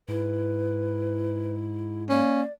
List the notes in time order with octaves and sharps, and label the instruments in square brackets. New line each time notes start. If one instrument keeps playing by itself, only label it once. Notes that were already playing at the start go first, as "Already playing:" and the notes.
[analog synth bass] G#2 [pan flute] E4 [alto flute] B4
[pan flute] A#3 [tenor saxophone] C#4 [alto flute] D5